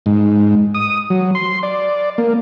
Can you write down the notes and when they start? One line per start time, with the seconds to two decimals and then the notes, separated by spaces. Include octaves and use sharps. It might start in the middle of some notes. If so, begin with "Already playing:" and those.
0.06 G#2
0.74 D#6
1.10 F#3
1.35 C6
1.63 D5
2.18 A#3